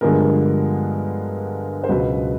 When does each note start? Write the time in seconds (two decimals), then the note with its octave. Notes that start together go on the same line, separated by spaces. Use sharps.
0.01 G2 D3 F3 G#3 B3 A#4
1.84 C5
1.89 C#2 B2 F#3 B4